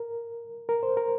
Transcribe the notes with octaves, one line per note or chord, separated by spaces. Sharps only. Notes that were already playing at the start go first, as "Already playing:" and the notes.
Already playing: A#4
A#4
C5
A#4